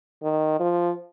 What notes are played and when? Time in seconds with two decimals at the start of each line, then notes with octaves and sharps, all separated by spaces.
0.23 D#3
0.60 F3